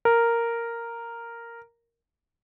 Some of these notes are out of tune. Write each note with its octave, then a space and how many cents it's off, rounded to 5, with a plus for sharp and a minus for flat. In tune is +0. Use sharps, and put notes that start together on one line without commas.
A#4 -5